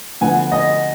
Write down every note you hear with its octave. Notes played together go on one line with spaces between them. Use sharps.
D2 D3 F3 B3 G#5
D#5